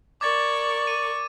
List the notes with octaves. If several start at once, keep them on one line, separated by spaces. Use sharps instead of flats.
A#4 D5 C#6 D6 G#6 A6
D#7